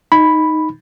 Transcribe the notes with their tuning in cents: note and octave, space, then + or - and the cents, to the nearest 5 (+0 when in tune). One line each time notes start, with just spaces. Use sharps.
D#4 +0 B5 +0